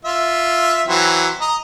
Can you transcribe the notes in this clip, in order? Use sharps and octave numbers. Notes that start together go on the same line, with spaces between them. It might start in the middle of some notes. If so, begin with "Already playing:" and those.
F4 E5
E3 F#3 C4
D#5 A#5